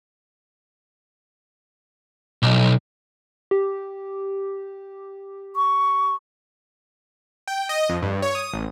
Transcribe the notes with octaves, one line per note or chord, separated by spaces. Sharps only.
B1
G4
C#6
G5
D#5
F2
G2
C#5
D#6
A1